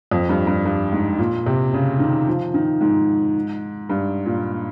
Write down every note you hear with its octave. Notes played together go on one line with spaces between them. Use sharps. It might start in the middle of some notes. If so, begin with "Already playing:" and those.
F2
G2
G2
G2
G#2
A#2
C3
C#3
D#3
F3
D#3
G#2
G2
A#2